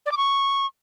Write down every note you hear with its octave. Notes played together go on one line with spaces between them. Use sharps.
D5
D6
C#6